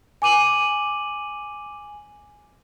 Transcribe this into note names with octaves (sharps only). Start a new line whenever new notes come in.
G#5 D6 D#7 F#7